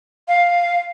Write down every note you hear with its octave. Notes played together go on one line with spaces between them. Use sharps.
F5